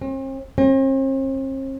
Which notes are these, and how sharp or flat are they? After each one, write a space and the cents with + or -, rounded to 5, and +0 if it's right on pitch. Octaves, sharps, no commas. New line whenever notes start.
C4 +45
C4 +45